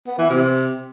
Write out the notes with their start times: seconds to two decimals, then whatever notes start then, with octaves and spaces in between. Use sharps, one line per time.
0.07 B3
0.18 E3
0.30 C3